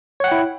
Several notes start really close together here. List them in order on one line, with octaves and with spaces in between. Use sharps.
C#5 F#5 G5 E4